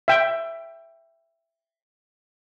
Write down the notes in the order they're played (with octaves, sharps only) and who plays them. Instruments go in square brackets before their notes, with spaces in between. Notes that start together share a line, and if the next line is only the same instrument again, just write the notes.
[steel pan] E5 G5